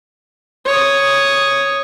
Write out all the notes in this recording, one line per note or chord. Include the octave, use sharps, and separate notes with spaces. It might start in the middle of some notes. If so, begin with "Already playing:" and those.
C#5 D#6